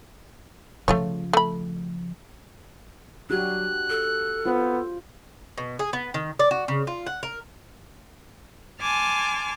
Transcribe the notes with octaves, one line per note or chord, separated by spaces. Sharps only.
C#3 F3 A3 F4 C#5
A3 B5
F#3 D4 F#4 G4 F#6
A4
B3 F4 C5
B2
G#4
B3
D#3
D5
F#4
C#3
F4
F#5
A#4
G#5 A5 C6 D6 F6